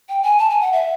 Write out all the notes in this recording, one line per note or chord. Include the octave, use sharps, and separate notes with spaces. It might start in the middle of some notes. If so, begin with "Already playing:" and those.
G5
G#5
A5
G#5
F#5
E5